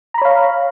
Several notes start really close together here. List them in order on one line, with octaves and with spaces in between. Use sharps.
A#5 B5 C#5 F5